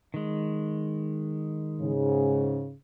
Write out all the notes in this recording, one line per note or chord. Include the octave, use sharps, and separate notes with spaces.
D#3 G#3
G#2 C#3